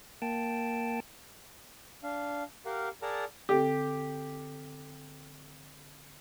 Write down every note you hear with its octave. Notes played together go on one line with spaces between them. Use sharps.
A#3 G5 A5
D4 F5
G4 A#4 F5 F#5
G#4 A#4 D5 F#5 A5 A#5
D3 C4 G4 A4